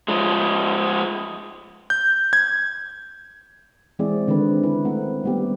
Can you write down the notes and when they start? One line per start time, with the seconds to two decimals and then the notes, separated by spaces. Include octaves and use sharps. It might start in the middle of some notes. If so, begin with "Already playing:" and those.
0.08 F3 G#3
1.90 G6
2.33 G#6
3.99 E3 G#3 C4 E4 G#4 D5
4.28 D3 D#3 G#3 C4 B4
4.63 C#4 E4 B4
4.85 A3 C4 A#4 F#5
5.24 G3 B3 G4